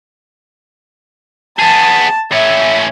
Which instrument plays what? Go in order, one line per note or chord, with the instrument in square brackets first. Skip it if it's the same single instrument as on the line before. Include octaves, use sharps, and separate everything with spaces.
[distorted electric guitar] B3 G#4 [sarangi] A5
[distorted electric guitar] A2 C#4 [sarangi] E5